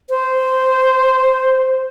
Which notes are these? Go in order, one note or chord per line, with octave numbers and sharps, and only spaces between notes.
C5